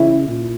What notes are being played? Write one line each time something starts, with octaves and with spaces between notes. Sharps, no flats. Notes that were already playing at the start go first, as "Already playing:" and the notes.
Already playing: C#3 E3 G#3 C#4 E4
A#2